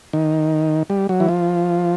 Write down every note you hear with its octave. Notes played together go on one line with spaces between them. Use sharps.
D#3
G3
F#3
E3
F3